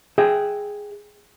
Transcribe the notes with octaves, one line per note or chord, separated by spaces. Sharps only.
G#4 E5 G5